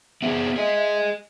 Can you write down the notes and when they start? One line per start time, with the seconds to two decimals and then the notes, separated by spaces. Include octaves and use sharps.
0.22 B3 C4 G#4 E5
0.56 G#4 D#5